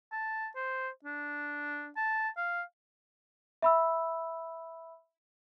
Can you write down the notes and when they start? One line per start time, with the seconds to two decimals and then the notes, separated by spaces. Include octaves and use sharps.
0.12 A5
0.56 C5
1.05 D4
1.97 A5
2.37 F5
3.62 E5 B5 E6